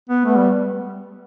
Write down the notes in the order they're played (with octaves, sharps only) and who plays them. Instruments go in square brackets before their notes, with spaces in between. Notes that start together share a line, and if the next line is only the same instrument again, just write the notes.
[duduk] B3
[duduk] A3 [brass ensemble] B3
[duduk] G3